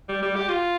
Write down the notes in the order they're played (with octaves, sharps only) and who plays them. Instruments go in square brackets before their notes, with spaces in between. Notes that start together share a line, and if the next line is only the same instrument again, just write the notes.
[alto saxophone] G3
G3
G4
F4